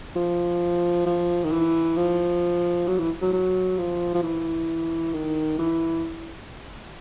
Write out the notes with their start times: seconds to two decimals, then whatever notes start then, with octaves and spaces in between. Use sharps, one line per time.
0.16 F3
1.06 F3
1.44 D#3
1.51 E3
1.97 F3
2.87 F#3
2.98 E3
3.21 F#3
3.33 F#3
3.78 F3
4.14 F3
4.23 E3
5.13 D#3
5.59 E3